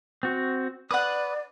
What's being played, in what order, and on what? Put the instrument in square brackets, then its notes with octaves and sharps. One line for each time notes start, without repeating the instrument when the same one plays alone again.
[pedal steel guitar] C4 F#4
[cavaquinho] B4 F#5 [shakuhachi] D5 [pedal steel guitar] D#6